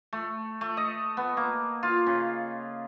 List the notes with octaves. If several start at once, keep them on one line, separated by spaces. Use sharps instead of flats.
A3
A3
D#5
B3
A#3
F4
C#3